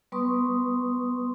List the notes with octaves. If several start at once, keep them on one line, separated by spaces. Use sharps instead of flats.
G3 B3 B4 C6 C#6 D#6